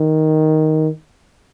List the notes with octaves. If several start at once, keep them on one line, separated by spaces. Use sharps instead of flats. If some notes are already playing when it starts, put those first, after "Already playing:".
Already playing: D#3